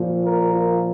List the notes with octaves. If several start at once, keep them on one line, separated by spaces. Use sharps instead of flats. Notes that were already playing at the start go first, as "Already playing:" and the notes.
Already playing: A#2 F3
F4 A#4
F4 A#4